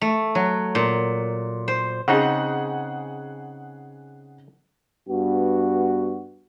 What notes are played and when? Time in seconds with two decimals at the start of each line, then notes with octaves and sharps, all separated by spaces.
0.01 A3
0.35 F#3
0.75 A#2
1.68 C5
2.08 C#3 C4 D#4 G#4 F#5
5.09 G2 B3 F#4